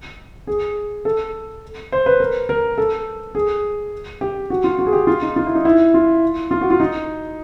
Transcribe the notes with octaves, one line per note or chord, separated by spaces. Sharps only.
G#4
A4
C5
B4
A#4
A#4
A4
G#4
G4
F#4
F4
F#4
G#4
G4
F4
D#4
F4
E4
D#4
E4
F4
F4
F#4
F4
D#4